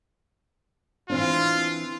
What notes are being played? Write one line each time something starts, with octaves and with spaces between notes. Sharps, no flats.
E3 C4 D4 F4